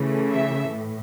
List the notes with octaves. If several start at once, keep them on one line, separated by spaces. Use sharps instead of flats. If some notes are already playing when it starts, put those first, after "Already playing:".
Already playing: C#3 E3 A3
E5
A2